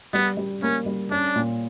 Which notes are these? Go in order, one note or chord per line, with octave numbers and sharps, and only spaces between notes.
G3 B3
G3
A#3 C#4
G3
C#4 D4
A#2